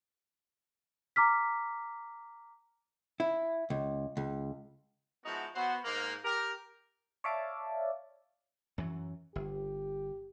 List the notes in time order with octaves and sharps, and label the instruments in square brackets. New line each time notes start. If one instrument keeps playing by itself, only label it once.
[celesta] A#5 D6 F6 B6
[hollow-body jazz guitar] E4
C#2
C#2
[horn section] F3 G#3 B3 D#4 E4 F#4
B3 F#4 C5
G#2 A#3
G4 A#4
[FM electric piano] C#5 D5 E5 F5 A5 D6
[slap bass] F#2 E3 F#3
[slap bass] G1 [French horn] G4